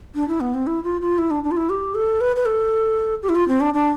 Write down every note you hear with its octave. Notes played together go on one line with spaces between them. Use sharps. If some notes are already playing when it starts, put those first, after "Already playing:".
D4
E4
B3
C4
E4
F4
F4
E4
D4
D4
F4
E4
G4
A4
B4
B4
A4
G4
E4
F4
C4
D4
D4